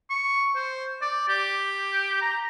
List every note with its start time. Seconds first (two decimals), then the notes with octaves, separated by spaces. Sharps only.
0.10 C#6
0.55 C5
1.02 D5
1.29 G4
2.21 A#5